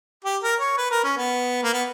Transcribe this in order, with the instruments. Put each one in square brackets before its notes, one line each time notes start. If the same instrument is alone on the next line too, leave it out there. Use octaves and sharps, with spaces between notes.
[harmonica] G4
A#4
C#5
B4
A#4
C#4
B3
A#3
B3